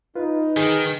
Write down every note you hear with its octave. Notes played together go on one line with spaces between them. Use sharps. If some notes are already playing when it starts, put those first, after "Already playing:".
D#4 F4 B4
D#3 G#4